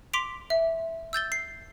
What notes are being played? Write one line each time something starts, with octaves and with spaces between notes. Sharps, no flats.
C6 D6 B6 D7 F7
E5
E6 G6 A6 G7
C7